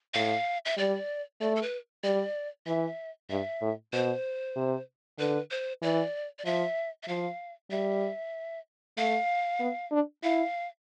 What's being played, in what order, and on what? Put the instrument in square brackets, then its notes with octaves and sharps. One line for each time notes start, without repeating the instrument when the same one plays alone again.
[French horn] A2 [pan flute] F5
[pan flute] E5
[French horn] G3 [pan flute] D5
[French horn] A3 [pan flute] D5
[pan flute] A4
B4
[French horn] G3 [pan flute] D5
[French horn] E3 [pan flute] E5
[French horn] G2 [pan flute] E5
[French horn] A2
[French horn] B2 [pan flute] C5
[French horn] C3
[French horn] D3 [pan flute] B4
[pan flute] C5
[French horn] E3 [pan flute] D5
[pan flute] D5
[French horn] F3 [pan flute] E5
[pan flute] E5
[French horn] F3 [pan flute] F5
[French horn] G3 [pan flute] E5
[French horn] A3 [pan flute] F5
[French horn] B3
D4
[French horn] E4 [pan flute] F5